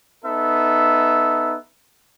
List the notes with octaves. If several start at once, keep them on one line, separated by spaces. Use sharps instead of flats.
B3 D#4 A4 E5